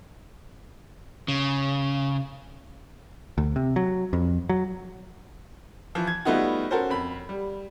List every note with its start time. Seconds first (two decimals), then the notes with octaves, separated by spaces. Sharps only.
1.28 C#3
3.38 D2
3.56 C3
3.76 F#3
4.13 F2
4.49 F#3
5.95 E3 F3
6.07 G#6
6.25 G3 A3 B3 D#4 F4 F#4
6.71 C#4 F#4 A4 A#4 C5
6.90 F2 B5
7.29 G3